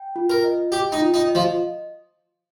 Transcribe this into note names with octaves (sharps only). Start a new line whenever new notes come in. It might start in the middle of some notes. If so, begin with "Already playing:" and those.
Already playing: G5
F4
A#4
D#5
G4 G5
D#4
F4
D#4
D#5
F3